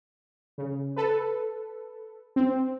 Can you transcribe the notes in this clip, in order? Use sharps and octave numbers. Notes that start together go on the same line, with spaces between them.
C#3
A4 B4
C4